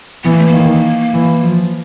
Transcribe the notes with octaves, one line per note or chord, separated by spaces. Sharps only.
E3 B3
A#3
A3
A#3
D#3
E3
F3